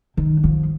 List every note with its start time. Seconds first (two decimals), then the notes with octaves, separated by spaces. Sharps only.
0.17 D#3
0.44 F3